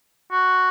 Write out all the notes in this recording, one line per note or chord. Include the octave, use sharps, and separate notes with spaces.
F#4